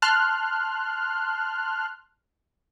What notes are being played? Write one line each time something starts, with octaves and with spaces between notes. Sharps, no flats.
A5 C6 F6 F#6